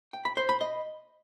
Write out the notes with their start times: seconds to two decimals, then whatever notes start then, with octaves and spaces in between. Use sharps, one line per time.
0.13 G5
0.25 B5
0.37 C5
0.49 B5
0.61 D#5